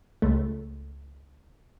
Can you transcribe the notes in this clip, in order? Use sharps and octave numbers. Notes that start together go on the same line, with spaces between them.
C#2 A3